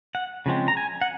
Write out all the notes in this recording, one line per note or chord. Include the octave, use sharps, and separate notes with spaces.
F#5
C#3 F3 G#3 C4
A#5
G#5
F#5